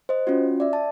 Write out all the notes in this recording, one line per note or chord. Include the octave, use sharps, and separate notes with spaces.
C5 D#5
C#4 F4 F#4
D5 E5
A5